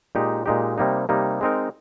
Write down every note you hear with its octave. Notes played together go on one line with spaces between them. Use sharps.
A#2 G#3 D#4 G4
A#2 G#3 D#4 G4
C3 G3 A#3 D#4
C3 G3 A#3 D#4
G#3 C4 D#4 A#4